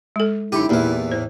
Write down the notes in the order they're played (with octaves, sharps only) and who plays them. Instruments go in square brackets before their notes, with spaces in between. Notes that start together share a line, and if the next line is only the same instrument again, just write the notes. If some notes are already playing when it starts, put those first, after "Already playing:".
[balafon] G#3 A4
[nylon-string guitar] F#2 D3 [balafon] D#4 G5 [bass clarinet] E4 [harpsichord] G4
[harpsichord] E2 E3 [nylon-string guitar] A#2 A#3 G4
[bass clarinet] A2 [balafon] C5